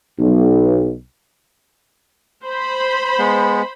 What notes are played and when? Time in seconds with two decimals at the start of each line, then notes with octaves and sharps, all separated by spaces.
0.20 B1
2.44 C5 B5
3.19 G#3 B3